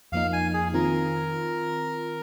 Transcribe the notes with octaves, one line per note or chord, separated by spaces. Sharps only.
F2 F3 A#3 D#4 F5
G#5
G#4
D#3 C4 F4 A#4